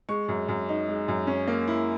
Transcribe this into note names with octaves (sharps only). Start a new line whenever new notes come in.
G#3 C#6
F#2
F#2
D#4
G#3
F#2
C#4
A#3
E4